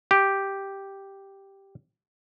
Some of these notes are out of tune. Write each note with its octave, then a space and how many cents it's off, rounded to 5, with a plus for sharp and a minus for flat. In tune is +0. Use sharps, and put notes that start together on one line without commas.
G4 +0